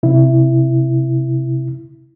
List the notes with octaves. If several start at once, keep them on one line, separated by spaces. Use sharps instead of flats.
C3 E4